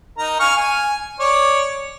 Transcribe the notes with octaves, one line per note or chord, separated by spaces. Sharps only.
D#4 A#4 A#5
F5 G#5 C#6
G#5
C#5 D5